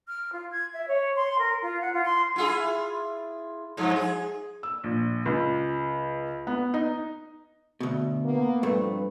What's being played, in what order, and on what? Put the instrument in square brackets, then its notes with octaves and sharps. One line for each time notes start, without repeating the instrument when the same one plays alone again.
[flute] F6
F4
G#6
E5
C#5
C6
A#4
F4
F#5
F4
C6
[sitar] E4 F4 G#4
G2 F3
G#4
[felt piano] E6
A#1
C#2
B3
D#4
[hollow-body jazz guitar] D2 B2
[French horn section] A#3 B3
[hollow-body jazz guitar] G2 A3 [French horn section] F3 C4 B4